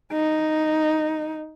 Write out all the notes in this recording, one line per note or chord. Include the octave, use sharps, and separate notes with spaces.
D#4